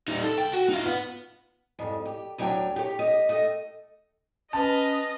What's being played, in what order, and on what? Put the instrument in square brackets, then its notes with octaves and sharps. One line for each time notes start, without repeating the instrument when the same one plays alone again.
[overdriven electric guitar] G3 D#4
A4
C2 G5
F#4
D#4 F4
B3
[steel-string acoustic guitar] F2 G#2 G3
G4
D2 F#3 D4 C#5 G5
G4 C#5
G4 D#5
A3 D#5
[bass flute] C#4 [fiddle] B4 F6 [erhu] D#5 [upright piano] A5